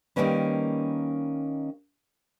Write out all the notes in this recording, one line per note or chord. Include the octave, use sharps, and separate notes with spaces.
D#3 F#3 G3 A#3 C#4 B4